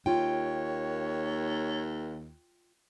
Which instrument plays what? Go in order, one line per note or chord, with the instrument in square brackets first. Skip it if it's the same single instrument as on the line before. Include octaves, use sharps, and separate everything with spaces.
[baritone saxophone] D#2 [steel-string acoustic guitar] F4 G5 [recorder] C#5